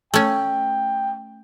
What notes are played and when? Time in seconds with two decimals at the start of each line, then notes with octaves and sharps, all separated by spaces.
0.14 A3 C#4 G5